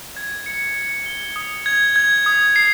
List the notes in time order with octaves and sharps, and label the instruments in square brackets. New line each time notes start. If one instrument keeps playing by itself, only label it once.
[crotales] G#6
C#7
C#7
G7
D#6
G#6
G#6
D#6
C7